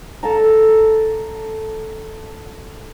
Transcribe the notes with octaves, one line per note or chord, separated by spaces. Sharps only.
A4 A5 A#5